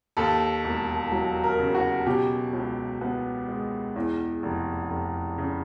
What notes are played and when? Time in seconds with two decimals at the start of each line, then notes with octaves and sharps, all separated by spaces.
0.17 D#2 A4
0.64 E1
1.12 F#3
1.44 A#4
1.59 C#3
1.75 F#4
2.06 B2 G4
2.53 C#2
3.01 B3
3.49 G#3
3.96 E2
4.43 F1
4.90 F1
5.38 C#3